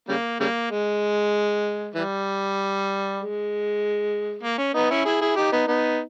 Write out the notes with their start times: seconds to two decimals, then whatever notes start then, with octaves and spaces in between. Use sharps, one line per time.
0.09 C#3 G3 A#3
0.40 C#3 G3 A#3
0.70 G#3
1.95 E3 G3
3.19 G#3
4.43 A#3
4.58 C#4
4.75 B3 D#4
4.90 C#4 E4
5.05 E4 G#4
5.21 E4 G#4
5.36 D#4 G4
5.52 B3 D#4
5.67 B3 D#4